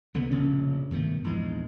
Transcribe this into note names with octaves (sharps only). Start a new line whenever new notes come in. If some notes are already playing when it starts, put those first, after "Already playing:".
C2 D3 B3
F1 A#1 C#3 C#4
G2 B2 D#3 A3
A#1 E2 G#2 G#3